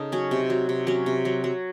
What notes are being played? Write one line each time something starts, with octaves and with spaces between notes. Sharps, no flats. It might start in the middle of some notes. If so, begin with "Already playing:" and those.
Already playing: C#3 D#4 A4
F#3 C#4
C3
F#3
C3
F#3 C#4
C3
F#3
F#3